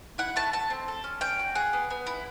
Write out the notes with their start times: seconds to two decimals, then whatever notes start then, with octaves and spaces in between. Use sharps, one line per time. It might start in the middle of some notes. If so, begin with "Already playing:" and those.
0.18 E4 F#5
0.36 A3 A5
0.53 A3 A5
0.70 C4
0.88 A4
1.04 C#4
1.21 C#4 G5
1.39 F#4
1.55 G#4 F#5
1.73 B3
1.90 B3
2.07 E4